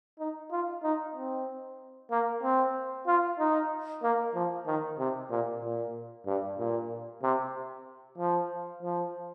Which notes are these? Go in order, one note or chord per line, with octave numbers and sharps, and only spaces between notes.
D#4
F4
D#4
C4
A#3
C4
F4
D#4
A#3
F3
D#3
C3
A#2
A#2
G2
A#2
C3
F3
F3